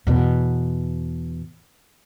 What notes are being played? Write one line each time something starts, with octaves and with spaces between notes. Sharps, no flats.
E2 B2